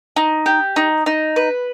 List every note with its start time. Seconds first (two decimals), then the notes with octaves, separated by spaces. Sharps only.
0.16 D#4
0.46 G4
0.76 D#4
1.06 D#4
1.36 B4